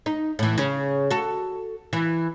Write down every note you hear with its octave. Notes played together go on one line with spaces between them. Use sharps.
D#4
A2 E3
C#3
F#4 A4
E3